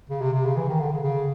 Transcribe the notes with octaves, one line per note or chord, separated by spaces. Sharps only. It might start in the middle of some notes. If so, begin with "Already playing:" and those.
C#3
C3
C3
C#3
E3
D#3
D3
C#3
C#3